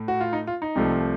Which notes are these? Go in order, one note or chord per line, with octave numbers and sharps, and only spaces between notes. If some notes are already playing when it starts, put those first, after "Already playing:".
Already playing: A2 A3
F#4
F4
D#4
F4
D#4
C2 C3 F3 A3